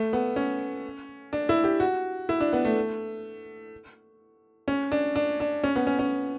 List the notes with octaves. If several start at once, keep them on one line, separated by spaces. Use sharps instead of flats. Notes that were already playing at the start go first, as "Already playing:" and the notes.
Already playing: A3
B3
C#4
D4
E4
G4
F#4
E4
D4
B3
A3
C#4
D4
D4
D4
C#4
B3
C#4
C#4